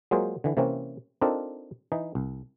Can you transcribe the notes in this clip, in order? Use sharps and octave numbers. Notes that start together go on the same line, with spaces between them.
F#3 G#3 A#3 F4 G#4 C5
D3 E3
C3 E3 A#3 C4 C#4
C4 D4 D#4 F4 A4 A#4
E3 D#4
C2